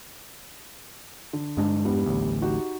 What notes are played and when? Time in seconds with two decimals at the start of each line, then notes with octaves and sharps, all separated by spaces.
1.33 D3
1.57 G2 G#3 D4
1.84 E2 G3 B3
2.06 A1 D2
2.41 D#4 F#4 G4